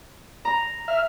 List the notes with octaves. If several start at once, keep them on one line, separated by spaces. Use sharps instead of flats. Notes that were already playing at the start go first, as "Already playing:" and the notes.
A#5
E5 F6